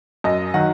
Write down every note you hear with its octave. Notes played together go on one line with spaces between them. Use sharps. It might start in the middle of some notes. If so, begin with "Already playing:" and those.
F#2 D#5
D#3 F#3 F#5